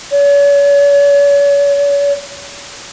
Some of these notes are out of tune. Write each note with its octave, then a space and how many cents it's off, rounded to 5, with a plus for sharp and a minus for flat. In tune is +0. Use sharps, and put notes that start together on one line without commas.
C#5 +40